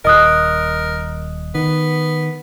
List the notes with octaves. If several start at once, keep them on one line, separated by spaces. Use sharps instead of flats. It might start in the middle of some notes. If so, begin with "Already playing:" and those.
D#1 A#4 D#5 D#6 F#6
D#3 B3